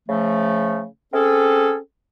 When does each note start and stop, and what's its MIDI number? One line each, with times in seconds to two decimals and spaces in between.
0.08 0.84 49
0.08 0.84 53
0.08 0.84 57
1.12 1.76 60
1.12 1.76 61
1.12 1.76 68
1.12 1.76 69